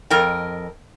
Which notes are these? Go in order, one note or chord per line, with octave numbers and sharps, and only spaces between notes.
F2 A#4 D#5 G5